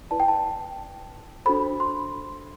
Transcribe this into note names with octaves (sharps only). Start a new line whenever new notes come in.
E4 B4 D5 A5
G5
A5
D4 F#4 A4 C5 B5
C6